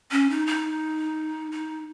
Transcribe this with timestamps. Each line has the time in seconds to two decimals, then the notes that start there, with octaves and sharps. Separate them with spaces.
0.11 C#4
0.30 D#4
0.47 D#4
1.52 D#4